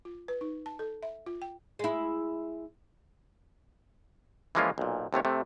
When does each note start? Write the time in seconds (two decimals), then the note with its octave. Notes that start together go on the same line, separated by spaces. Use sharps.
0.05 F4
0.28 B4
0.41 D#4
0.66 A5
0.79 A4
1.03 E5
1.26 F4
1.42 G5
1.79 G#3 E4
4.55 E3 F3 G#3 A#3 C#4 F4
4.78 B1 A#2
5.13 D#2 C3 A3 C#5
5.25 C3 A3